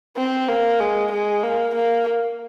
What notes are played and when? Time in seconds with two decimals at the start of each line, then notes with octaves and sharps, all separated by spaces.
0.17 C4
0.49 A#3
0.81 G#3
1.13 G#3
1.43 A#3
1.75 A#3